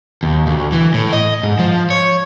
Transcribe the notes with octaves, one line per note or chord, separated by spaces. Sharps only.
D#2
D2
E3
A2
D#5
G#2
F3
C#5